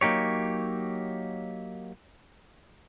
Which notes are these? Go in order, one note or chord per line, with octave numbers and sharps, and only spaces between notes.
F#3 A#3 D#4 G4 C#5